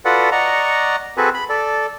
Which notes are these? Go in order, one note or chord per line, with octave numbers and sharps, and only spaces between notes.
F4 F#4 A4 B4 D5 F#5
D5 D#5 F#5 A#5 C#6
C4 F#4 G#4 A4 B4
B5
A4 D5